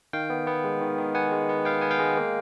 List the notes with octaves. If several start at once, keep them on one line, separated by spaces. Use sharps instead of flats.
D#3 F5 G5
B3
B3
G#3
D#3
D#3
B3 F#5 G#5
G#3
B3
B3 F5 G5
B3 G#5
F5 G5
G#3
A#3